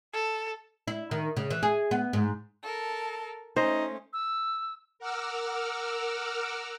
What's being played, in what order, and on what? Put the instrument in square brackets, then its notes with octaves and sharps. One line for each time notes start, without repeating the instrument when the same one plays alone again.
[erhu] A4
[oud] E4
D#3
C#3
E3
G#4
B3
G#2
[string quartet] A4 A#4
[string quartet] A3 C#4 [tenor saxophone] D#4 [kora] C5
[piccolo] E6
[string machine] A#4 F#5 D6 E6 F6